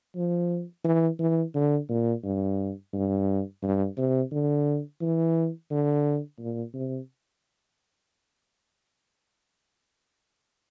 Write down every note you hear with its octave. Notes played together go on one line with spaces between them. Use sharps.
F3
E3
E3
D3
A#2
G2
G2
G2
C3
D3
E3
D3
A#2
C3